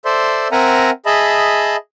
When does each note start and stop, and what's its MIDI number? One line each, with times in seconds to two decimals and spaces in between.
0.05 0.48 69
0.05 0.48 72
0.05 0.48 74
0.05 0.48 76
0.05 0.48 84
0.52 0.91 60
0.52 0.91 70
0.52 0.91 76
0.52 0.91 78
0.52 0.91 80
0.52 0.91 82
1.06 1.76 68
1.06 1.76 75
1.06 1.76 76
1.06 1.76 81
1.06 1.76 83